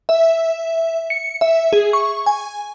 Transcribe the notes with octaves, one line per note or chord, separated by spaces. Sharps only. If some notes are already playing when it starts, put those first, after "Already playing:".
E5
C#7
E5
G#4
C#6
G#5